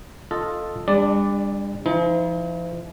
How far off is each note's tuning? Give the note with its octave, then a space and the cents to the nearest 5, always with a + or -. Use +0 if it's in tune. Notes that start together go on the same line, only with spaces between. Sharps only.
F4 +5 A4 +0 D#5 +0
G3 +40 D4 +5 D5 +0
F3 -40 D#4 +40